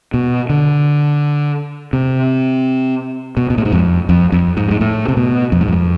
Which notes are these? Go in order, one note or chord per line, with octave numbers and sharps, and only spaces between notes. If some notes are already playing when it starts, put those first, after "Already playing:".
B2
D3
C3
B2
B2
A2
G#2
F2
F2
F2
G#2
G#2
A2
C3
B2
F2
G#2
F2